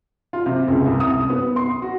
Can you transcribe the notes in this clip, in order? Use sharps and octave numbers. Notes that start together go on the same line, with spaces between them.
F4
C3
C#2
C2
D#6
B3
C6
F#4